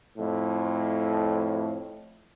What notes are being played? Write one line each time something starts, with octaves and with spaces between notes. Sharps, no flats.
F2 A2